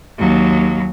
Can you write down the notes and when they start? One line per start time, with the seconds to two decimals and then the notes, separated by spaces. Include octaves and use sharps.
0.19 D#2 F#3